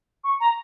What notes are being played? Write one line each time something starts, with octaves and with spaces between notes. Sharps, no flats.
C#6
A#5